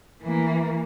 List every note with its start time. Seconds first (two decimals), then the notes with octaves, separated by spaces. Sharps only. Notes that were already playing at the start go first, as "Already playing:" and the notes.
0.22 E3 A#3